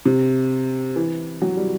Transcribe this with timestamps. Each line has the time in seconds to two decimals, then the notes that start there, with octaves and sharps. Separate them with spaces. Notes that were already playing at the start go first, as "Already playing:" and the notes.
0.06 C3
0.96 E3
1.42 F#3
1.57 G3